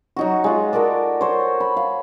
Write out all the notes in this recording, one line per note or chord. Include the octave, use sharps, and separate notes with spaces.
F#3 D#4 F#4
G#3 F4
F#4 A4 A#4 D5
C5 C#5
B5
F5